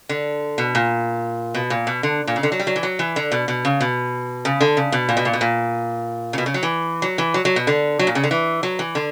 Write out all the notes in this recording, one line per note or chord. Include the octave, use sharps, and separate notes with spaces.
D3
B2
A#2
B2
A#2
B2
D3
A#2
C#3
D3
F#3
G3
F#3
E3
F#3
E3
D3
B2
B2
C#3
B2
C#3
D3
C#3
B2
A#2
B2
A#2
B2
A#2
C#3
B2
C#3
F#3
E3
F#3
E3
F#3
F#3
B2
D3
F#3
A#2
C#3
D3
E3
F#3
E3
D3